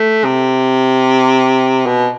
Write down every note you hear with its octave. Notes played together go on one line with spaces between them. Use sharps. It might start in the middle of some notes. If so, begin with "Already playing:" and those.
Already playing: A3
C3
B2